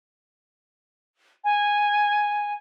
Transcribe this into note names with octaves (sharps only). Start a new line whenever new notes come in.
G#5